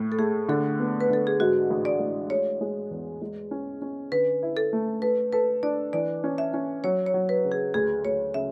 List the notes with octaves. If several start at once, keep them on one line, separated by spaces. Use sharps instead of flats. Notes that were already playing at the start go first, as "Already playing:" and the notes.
Already playing: A2 A3
A4
A3 G#4
D3 A4
B3
B4
D3 A4
G#4
G#2 F#4
A1
D5
A1
G#3 C#5
G#3
E2
G#3
C#4
C#4
D3 B4
E4
A4
A3
A4 B4
A4 B4
D4 D5
E3 D5
C#4
E5
C#4
F#3 C#5
C#5
F#3
B4
C#3
G#4
D2 G#4
D2 C#5
C#3 E5